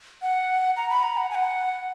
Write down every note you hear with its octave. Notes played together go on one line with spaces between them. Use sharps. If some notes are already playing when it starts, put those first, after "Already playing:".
F#5
A#5
B5
A#5
F#5
G#5
F#5